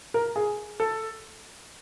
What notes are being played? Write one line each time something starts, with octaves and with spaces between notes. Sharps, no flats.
A#4
G#4
A4